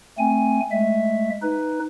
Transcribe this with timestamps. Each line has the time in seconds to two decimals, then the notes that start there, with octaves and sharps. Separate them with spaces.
0.18 A3 C4 G#5
0.71 G#3 A3 E5
1.43 D#4 B4